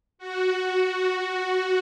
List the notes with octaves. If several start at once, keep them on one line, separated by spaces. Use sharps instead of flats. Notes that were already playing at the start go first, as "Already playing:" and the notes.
F#4